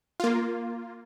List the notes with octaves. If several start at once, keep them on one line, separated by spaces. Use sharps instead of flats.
A#3 F4